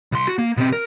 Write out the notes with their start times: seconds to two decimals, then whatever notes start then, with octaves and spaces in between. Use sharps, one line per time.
0.12 C2 C6
0.27 F#4
0.38 A#3
0.57 B2 C4
0.73 A#4